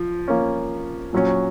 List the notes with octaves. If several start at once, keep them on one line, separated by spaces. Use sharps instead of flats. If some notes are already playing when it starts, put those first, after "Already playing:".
Already playing: F3
F3 A#3 C#4
A#2 F#3 C#4